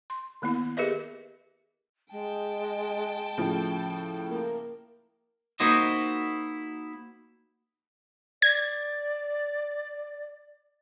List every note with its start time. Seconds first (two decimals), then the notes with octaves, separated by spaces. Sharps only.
0.10 C6
0.42 D#3 A#3 B3 E4
0.77 G4 G#4 A#4 B4 D#5 E5
2.11 G#3 G5 A5
3.38 A2 C#3 F3
4.28 A#3
5.60 A#3 D#4 E4 F#4 C5 D#5
8.42 D5 G#6